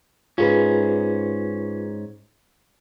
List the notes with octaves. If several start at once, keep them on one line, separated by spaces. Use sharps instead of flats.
G#2 C#4 F4 G#4 B4